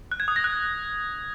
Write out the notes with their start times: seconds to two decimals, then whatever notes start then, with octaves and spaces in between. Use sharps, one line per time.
0.12 F#6
0.20 G#6
0.28 D#6
0.36 A#6
0.44 F#6